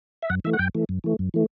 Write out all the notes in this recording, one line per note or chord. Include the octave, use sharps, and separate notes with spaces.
E5
F#2 F#5
E3 A3 E5
F#5
F#2 G5
E3 A3
F#2
E3 A3
F#2
E3 A3